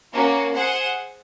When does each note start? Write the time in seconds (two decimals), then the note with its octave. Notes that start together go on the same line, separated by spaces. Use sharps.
0.13 A#3 C#4 F#4
0.53 G#4 C5 F#5